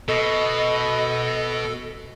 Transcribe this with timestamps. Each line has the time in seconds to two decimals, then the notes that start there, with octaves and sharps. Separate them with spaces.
0.08 B2 A4 D#5